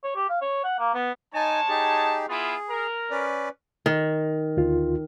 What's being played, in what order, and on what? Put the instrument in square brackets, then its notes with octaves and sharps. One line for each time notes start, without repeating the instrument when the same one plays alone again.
[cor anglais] C#5
G4
F5
C#5
F#5
A#3
B3
[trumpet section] G#3 C#5 A5 [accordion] D#4 G#5
[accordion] D#4 G4 G#4
[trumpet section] B3 E4 F4 [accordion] G#4
[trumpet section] A#4
[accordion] C#4 B4 D5
[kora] D#3
[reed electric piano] D2 F4